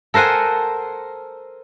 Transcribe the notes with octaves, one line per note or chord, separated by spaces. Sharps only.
A4 A#4 C5 F#5 G#5